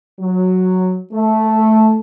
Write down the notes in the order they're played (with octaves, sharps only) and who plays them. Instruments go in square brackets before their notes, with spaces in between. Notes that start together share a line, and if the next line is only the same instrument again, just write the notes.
[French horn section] F#3
A3